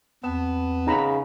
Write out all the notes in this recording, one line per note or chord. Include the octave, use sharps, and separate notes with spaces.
E2 B3 C4 A5
C#3 D#4 A#5 B5